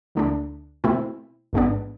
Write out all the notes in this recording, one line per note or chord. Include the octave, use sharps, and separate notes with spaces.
D2 D3 A3 D4
B2 A3 C4 E4
A1 G#2 G#3 B3 D4